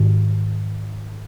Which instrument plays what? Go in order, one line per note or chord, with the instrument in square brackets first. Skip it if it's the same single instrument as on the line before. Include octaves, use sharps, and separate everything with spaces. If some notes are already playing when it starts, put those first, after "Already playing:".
Already playing: [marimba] G#2 D#3